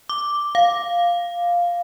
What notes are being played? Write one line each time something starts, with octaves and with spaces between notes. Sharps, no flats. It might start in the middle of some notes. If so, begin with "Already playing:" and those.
D6
F5